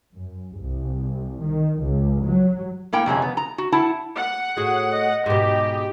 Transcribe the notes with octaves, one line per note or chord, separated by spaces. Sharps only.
F#2
C2
D#3
C#2
F#3
A2 A#3 A#4 G5
F2 C3 G#3 C#4
B3
A#5
F#4
E4 F#5 A5
F#5
A2 F#4 G#4
D#5
G#2 B2 G4